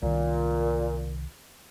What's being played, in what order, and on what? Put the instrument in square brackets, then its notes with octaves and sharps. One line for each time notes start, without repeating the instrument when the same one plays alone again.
[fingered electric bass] C2 D#3 [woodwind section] A#2